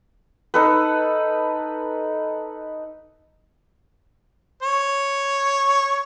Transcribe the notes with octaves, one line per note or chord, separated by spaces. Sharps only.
D#4 A4 B4
C#5